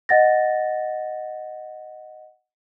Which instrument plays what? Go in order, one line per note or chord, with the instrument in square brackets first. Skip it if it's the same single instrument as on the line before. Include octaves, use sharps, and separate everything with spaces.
[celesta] D#5 F#5 A6 A#6